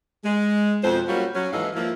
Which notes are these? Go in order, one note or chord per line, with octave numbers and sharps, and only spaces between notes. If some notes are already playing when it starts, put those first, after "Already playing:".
G#3
F2 B2 C5
F#3 G3 A#3 C#4 F4 F#4
F#3 C#4
D#2 G#2 E3 A4 D#5 F5
F3 A#3 E4